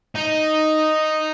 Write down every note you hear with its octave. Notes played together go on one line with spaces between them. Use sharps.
D#4